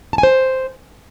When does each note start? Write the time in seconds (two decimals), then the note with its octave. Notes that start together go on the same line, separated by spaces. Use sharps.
0.13 A5
0.18 G#5
0.23 C5